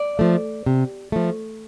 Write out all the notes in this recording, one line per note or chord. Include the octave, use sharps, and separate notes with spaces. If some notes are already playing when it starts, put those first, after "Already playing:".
Already playing: D5
F3 A3
C3
F3 A3